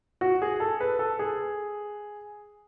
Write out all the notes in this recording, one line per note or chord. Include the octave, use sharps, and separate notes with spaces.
F#4
G#4
A4
B4
A4
G#4